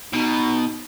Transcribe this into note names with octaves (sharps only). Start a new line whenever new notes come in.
B2 D#4